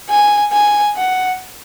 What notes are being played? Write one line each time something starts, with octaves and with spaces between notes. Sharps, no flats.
G#5
G#5
F#5